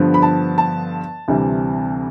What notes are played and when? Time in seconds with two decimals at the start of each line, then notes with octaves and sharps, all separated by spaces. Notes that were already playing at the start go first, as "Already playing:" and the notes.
Already playing: G2 D3 F3 B3
0.14 B5
0.23 A5
0.58 A5
1.28 D2 C3 E3 G3